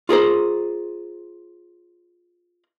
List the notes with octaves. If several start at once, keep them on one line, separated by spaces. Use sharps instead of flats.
F4 G#4 A#4 C5